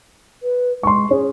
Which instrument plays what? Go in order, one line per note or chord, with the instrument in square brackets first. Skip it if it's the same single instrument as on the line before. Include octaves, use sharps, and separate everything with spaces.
[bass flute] B4
[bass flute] G#3 [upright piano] C6 C#6
[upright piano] C#4 [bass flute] G#4